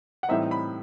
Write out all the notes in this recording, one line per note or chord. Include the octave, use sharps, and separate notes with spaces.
F#5
A2 E3 G3 C4 D#4 E5
B5